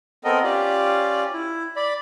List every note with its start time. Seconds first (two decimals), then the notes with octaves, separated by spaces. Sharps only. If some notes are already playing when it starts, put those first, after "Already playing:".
0.24 B3 C4 A4 A#4 D#5
0.43 C#4 F4 G4 D5
1.33 E4
1.76 D5 B5